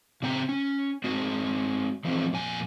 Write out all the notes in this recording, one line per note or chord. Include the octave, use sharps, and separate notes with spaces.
C#3 C4 G5 A#5
C#4
G#3 C4 F#4
E3 F3 G#3 B3 C4
F2 A#2 G#5